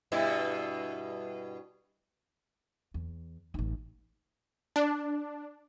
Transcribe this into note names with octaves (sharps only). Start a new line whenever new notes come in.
G2 B2 E4
E2
A1 D#4
D4